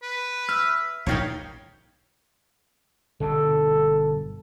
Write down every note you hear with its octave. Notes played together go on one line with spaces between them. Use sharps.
B4
E5 F6
A#1 G#2 D#3 D#4 G4 C#5 F5
G1 G2 B2 A4